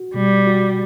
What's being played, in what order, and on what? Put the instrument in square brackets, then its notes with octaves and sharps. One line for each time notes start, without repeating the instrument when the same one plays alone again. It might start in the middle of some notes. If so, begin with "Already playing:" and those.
Already playing: [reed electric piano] F#4
[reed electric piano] B2 [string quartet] G3
[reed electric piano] F#4